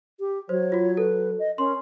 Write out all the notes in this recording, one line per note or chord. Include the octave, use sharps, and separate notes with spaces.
G4
F#3 C5 C#5
F4 F#4
A4 B4
D#5
C#4 A#4 C6